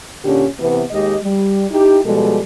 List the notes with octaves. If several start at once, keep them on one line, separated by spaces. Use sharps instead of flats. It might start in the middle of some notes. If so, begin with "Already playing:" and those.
A#2 D3 C#4 G4
C3 E3 B3
D#2 G#3 G4 D#5
G3
D#4 E4 G4
B2 F3 G3 G#3 A4